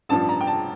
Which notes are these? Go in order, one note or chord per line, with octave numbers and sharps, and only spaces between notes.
A1 G2 F3 A5
A#5
G5
A5